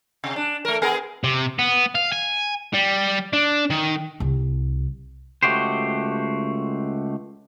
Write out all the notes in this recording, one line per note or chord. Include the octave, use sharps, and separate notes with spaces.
C3
D4
A3 A#4
B3 G#4 A#4
C3
B3
F5
G#5
G3
D4
D#3
C2
C#2 A3 F#4 G4 C5